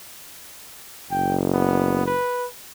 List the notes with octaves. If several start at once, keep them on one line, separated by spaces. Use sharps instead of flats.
F#1 G5
B3
B4